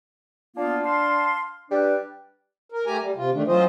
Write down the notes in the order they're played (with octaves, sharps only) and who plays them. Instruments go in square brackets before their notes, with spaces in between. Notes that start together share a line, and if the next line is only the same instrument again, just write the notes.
[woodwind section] A#3 B3 F4 [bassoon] D4
[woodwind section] F5 A5 C6
[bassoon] G3 [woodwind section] D4 B4 D5
[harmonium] A#4
A3 G4 G#5 A#5
G3
C3 F4
D#3 A3 D4
F#3 C#4 F4 C5 D#5